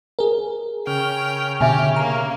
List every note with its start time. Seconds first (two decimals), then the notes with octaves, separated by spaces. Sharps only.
0.19 G#4 A#4
0.87 C#3 G5 F6
1.61 B2 D3 G4 E5 G#5
1.96 A#3 A#5